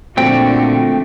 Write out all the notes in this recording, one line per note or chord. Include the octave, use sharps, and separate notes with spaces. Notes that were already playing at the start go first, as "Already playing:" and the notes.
A#2 D3 F3 A3 C4 F#4 G5